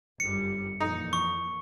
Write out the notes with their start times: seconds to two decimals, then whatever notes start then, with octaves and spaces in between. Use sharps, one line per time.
0.20 G1 F#2 G3 C#7
0.80 F2 A#2 E3 D#4
1.13 C#6